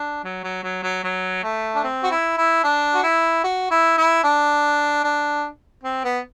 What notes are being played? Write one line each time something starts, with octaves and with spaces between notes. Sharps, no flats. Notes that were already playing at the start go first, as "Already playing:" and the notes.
Already playing: D4
F#3
F#3
F#3
F#3
F#3
A3
D4
C4
F#4
E4
E4
D4
F#4
E4
F#4
E4
E4
D4
D4
C4
B3